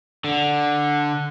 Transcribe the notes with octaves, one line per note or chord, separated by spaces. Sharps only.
D3